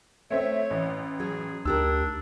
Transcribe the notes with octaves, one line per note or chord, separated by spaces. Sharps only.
A3 C4 C#5 E5
A1
F#3 G#4
D2 D4 D#4 G4 A#4 E6